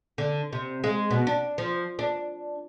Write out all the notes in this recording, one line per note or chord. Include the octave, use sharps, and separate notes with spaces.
D3
C3
G#3
B2
D4
F3
D4